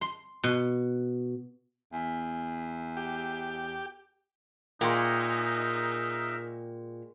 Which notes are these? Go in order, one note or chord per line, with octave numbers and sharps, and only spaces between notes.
C6
B2
E2
G4
A#2 G#3 D#4 A#4 E5 G5 C#6